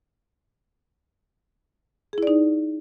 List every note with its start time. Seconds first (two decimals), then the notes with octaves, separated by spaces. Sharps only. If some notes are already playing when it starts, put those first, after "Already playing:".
2.13 G#4
2.18 E4
2.23 D5
2.27 D#4